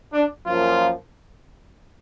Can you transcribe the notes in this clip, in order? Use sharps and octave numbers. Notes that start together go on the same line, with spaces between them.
D4
F#2 F3 A#3 F4